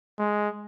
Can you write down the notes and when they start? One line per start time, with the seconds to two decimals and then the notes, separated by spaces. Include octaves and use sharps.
0.19 G#3